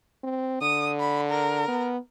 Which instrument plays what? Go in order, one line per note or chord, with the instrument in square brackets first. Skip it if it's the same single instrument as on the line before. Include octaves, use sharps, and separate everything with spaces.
[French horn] C4
[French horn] D3 [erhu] D#6
[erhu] B5
A#4
[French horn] B3